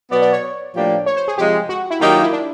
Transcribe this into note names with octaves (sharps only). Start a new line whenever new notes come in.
B2 F#3 B3 D5
D5
C#5
A2 F3 A#3 D4 G4
C#5
C5
G#4
C3 F3 G#3 G4
F#4
E4
D#3 F#3 A#3 D#4 F4 G4
F4
E4
D4